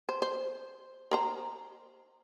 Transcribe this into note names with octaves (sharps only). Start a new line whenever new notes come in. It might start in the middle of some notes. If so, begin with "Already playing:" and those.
C5
C5
A#4 C5 A#5